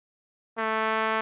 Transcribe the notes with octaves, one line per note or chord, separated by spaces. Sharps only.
A3